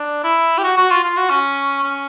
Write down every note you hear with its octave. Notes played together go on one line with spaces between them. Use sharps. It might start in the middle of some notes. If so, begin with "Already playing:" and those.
Already playing: D4
E4
G4
F#4
F#4
F4
F4
F#4
C#4
C#4